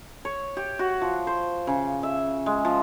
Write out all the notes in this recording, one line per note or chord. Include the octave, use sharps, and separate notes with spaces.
C#5
G4
F#4
F3
C5
C#3
E5
G#3
F3